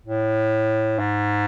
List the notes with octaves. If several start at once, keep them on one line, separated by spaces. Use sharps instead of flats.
A2
G#2